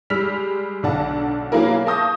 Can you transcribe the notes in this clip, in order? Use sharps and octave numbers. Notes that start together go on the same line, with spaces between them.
G3 G#3 E6 F6 B6 F7
B1 D3 D4 F#5 A5
F#3 A#3 B3 E4 G#4 A#4
F5 A5 C#6 D#6 G6 A#6